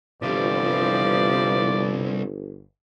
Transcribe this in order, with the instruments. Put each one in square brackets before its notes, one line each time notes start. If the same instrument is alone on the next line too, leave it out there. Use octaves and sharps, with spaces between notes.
[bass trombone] G1 [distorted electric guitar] C3 G3 [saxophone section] E3 F3 [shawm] D5